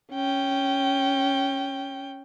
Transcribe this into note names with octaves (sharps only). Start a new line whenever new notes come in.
C#4 G5